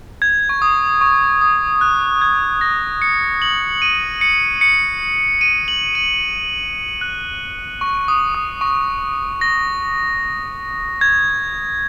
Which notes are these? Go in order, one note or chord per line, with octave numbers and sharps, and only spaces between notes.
G#6
C#6
D#6
C#6
D#6
F#6
G#6
A#6
C#7
F#7
D#7
C#7
C#7
D#7
F#7
D#7
F#6
C#6
D#6
D#6
C#6
A#6
G#6